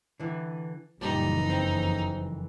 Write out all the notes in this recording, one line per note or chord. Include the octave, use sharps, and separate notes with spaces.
D3 E3
F#1 F2 A#2 E3 G3 D#4
C4